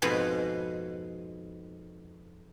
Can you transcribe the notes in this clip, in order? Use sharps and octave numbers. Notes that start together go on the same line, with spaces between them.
F2 G#2 B2 G#4 B4